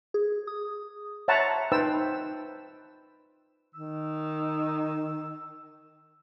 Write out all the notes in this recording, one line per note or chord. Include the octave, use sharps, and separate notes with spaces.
G#4
D#6
C#5 E5 F#5 A5 A#5 C6
D#4 B4 C5 G5 A5 E6
D#3 E6